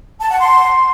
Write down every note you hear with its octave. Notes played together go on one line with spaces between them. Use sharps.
A5
F#5
C6